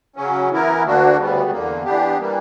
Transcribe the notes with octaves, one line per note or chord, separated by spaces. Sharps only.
C#3 F#3 C#4
E3 B3 E4 A#4
D2 D3 A#3 D4 F#4
D2 C#3 G3 B3
E2 D3 A#3
E3 B3 D4 G4
E3 G3 A#3